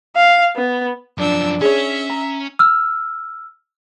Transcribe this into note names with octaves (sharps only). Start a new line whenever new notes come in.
F5
B3
F#2 F3 D4 E6
C#4 G#4 C#5 E5
A#5
E6 F6